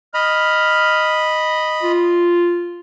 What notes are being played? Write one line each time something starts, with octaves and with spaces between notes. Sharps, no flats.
D#5 B5 F6
F4